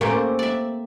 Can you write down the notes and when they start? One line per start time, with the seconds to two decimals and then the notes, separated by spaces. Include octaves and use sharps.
0.01 A3 A#3 C4 C#4 G4
0.39 D5 E5